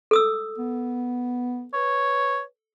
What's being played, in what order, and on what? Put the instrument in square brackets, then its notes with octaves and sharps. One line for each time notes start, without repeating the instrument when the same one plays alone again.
[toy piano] A4 D#6 E6
[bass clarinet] B3
[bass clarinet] B4 [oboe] C#5